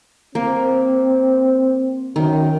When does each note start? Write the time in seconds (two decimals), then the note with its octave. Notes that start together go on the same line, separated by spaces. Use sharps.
0.35 A#3 C4
2.16 F#2 D#3